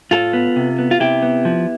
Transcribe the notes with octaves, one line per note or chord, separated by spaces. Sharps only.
A2 F4 A4
B3
C3
B3
F4
C3 E4 G4
B3
F3